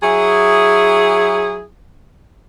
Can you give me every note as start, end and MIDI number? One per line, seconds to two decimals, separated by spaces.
0.03 1.64 54
0.03 1.64 64
0.03 1.64 68